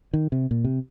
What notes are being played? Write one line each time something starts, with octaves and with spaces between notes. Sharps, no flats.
D#3
C3
A#2
C3